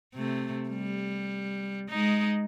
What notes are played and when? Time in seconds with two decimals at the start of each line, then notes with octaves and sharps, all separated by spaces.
0.14 C3 A3
0.69 G3
1.89 G#3 D#4